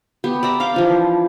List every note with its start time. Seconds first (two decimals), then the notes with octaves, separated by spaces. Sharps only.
0.24 B3 G4
0.43 D5 E5 A#5 B5
0.60 F5 G5 D6
0.74 E3 F3 D4